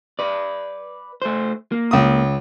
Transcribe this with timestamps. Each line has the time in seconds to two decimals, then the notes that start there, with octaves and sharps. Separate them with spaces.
0.19 B4 D5
1.22 A3 C5
1.72 A#3
1.91 C#2 D#6